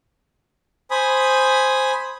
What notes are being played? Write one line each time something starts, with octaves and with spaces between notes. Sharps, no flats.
C5 G#5 B5 D#6